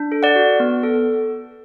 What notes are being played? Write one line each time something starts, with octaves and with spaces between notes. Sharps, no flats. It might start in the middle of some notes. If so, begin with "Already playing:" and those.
Already playing: D4
A4
D5 F#5
F#4
B3
A4